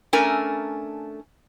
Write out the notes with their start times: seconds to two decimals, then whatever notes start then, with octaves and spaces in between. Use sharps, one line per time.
0.13 A3 C#4 D4 A#4 G#5 A#5